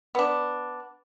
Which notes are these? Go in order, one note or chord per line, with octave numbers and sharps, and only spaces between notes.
B3 D4